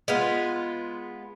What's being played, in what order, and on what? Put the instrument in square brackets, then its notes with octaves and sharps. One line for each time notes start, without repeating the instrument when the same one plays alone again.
[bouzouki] G#3 B3 F4